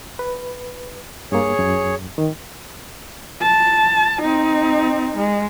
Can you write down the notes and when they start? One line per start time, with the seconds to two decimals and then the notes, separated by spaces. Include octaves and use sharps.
0.19 B4
1.32 G2 A#3 G#4 C#5
1.59 F#2
2.18 D#3
3.42 A5
4.22 C4 D#4
5.17 G#3